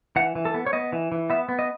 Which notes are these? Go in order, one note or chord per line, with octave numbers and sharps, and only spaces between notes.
E3 F#5
E3
A4
B3
C#5
B3 D#5
E3
E3
B3 E5
B3
D#5